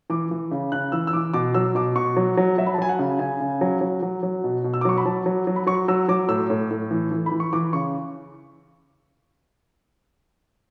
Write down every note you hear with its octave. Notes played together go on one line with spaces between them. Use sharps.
E3 D6
E3
C#3
C#3 F#6
E3 E6
E6
E3 D6
B2 D6
F#3 E6
B2 D6
B2 C#6
F#3
F#3
F#3 E5
B5
A5
F#3 G#5
F#5
C#3
C#3 G#5
C#3
F#3
F#3
F#3
F#3
B2
B2
E6
D6
F#3 C#6
B5
F#3 A5
F#3
F#3
B5
F#3 C#6
F#3 E6
F#3 D6
A2 E6
A2
A2
E3
E3
B5
E3
C#6
E3 D6
C#3 C#6